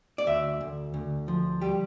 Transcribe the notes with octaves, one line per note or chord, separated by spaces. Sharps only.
D5
D2 E5
D2
D2
F3
G3 G4